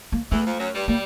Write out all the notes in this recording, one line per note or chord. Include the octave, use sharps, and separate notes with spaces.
A#3
E2 E3 A3
F2 F3
F#2 F#3
G2 G3
G3 A#3